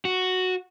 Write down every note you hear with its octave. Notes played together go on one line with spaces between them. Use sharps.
F#4